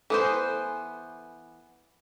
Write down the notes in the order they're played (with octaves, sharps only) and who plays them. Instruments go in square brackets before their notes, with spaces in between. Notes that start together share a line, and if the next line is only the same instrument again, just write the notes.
[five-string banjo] E3 B3 C5 [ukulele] A4 G#5